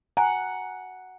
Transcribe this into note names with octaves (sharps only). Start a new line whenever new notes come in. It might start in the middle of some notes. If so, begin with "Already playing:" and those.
F#5 G#5 A#5